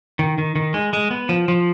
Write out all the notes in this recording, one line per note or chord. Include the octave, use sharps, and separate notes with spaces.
D#3
D#3
D#3
G#3
G#3
B3
F3
F3